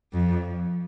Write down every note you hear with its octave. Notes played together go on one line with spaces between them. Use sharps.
F2